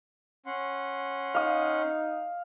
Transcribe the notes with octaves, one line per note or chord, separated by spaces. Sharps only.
C#4 F#5 C6
D#4 F5 D#6